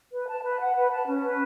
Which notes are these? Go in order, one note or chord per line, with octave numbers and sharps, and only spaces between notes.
B4
A5
B4
F#5
B4
A5
C#4
B4